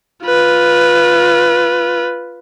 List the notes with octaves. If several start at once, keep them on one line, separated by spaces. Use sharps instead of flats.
F4 B4